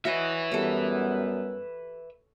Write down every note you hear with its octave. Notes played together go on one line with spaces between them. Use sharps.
F#4 B4 C#5 D#5 E5
F#2 G3 B3 G4 A4